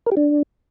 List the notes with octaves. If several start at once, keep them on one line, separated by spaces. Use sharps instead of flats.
A#4
G4
D4